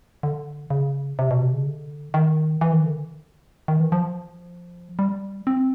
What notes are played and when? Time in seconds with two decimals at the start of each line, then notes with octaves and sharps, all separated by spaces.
0.23 D3
0.70 C#3
1.19 C3
1.31 B2
1.42 C3
1.54 C#3
1.66 D3
2.14 D#3
2.61 E3
2.73 D#3
2.85 D3
3.68 D#3
3.80 E3
3.92 F3
4.99 G3
5.47 C4